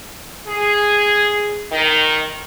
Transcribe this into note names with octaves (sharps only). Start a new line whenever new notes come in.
G#4
D#3